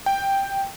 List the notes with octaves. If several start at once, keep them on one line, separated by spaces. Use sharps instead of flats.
G5